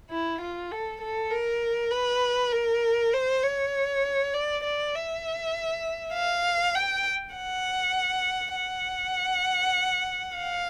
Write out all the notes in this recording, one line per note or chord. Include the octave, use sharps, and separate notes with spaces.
E4
F4
A4
A4
A#4
B4
A#4
C5
C#5
D5
D5
E5
F5
G5
F#5
F#5
F5